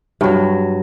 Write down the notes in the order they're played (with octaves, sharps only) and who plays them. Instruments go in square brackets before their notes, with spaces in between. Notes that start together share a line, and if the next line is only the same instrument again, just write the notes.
[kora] G2 F#3